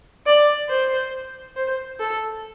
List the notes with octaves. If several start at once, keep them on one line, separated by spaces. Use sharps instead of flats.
D5
C5
C5
A4